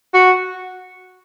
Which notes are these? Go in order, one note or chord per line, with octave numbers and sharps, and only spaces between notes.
F#4